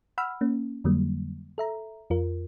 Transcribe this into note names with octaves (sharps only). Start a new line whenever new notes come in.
F#5 B5 E6 F6
A#3 C#4
F2 D3 F#3 G3 A#3
A4 E5 A#5
F2 F4 A#4